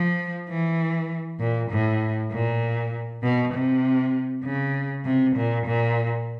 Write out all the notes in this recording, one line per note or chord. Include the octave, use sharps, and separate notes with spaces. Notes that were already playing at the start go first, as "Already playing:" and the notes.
Already playing: F3
E3
A#2
A2
A#2
B2
C3
C#3
C3
A#2
A#2